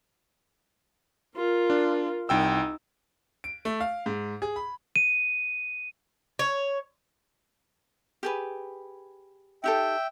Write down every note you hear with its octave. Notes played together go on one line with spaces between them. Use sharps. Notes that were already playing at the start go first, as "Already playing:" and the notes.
F4 A#4
D4
C2 D#4 G5 E6
D7
A3
F5
G#2
G#4
B5
D#7
C#5
G4 G#4 B4
D#4 G4 A4 E5 G5